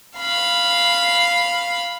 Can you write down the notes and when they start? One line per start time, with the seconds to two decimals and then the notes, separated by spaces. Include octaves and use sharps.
0.17 F5 B5